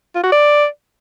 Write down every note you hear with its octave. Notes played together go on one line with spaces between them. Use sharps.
F4
F#4
D5